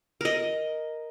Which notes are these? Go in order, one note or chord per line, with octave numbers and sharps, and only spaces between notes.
A#4 D#5